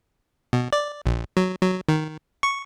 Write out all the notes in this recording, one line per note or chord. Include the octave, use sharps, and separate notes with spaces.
B2
D5
A#1
F#3
F#3
D#3
C#6